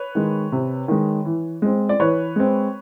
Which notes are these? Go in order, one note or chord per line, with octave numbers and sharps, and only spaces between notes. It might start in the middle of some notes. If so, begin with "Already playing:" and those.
Already playing: B4 C#5
D#3 G#3
C3
D#3 G#3
E3
G#3 C4
D5
E3 B4 C#5
G#3 C4